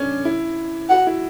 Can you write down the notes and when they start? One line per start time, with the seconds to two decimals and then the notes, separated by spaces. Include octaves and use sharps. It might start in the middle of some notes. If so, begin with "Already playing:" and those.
Already playing: C#4 D4
0.25 E4
0.90 F#4 F#5
1.07 E4